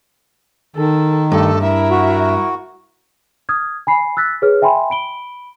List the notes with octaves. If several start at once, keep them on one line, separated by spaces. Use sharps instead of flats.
D#3 A4
G2 A3 A4
E4 A#4 E5
F#4
D#6 F6 G#6
G#5 B5 C7
E6 F#6 A6 B6
G#4 B4 C#5 F6
E5 G5 G#5 B5 C6
B5 D7 G7